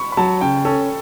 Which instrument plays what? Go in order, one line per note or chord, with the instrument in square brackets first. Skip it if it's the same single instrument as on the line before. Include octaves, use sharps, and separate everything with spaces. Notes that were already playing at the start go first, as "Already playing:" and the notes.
Already playing: [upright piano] B5 C#6
B5
[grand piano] F#3 [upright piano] A5
[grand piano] C#3 [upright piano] G5
[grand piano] C#4 [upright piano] A4